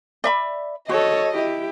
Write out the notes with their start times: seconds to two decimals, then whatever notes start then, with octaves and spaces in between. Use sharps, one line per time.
0.24 D5 E5 B5
0.89 F#4 A4 C#5 D#5
1.32 E4 G4